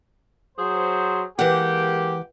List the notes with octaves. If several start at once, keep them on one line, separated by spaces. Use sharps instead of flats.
F#3 G#4 C5
E3 G#3 A#3 G4 F#5